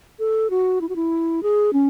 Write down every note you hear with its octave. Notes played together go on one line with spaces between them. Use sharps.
A4
F#4
E4
F#4
E4
G#4
C#4